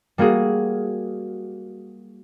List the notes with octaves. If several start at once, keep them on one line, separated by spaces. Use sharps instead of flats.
G3 A#3 F#4 G#4